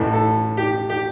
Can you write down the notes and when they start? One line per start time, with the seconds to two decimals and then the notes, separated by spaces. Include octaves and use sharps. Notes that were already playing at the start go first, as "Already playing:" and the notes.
Already playing: A1 A2 E3
0.13 A4
0.57 G4
0.90 G4